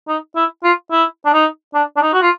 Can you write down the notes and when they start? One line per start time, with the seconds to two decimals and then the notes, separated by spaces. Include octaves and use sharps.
0.08 D#4
0.36 E4
0.64 F4
0.91 E4
1.25 D4
1.33 D#4
1.74 D4
1.96 D4
2.02 D#4
2.14 F#4
2.22 F4